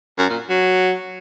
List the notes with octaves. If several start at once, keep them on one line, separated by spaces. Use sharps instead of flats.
F#2
A#2
F#3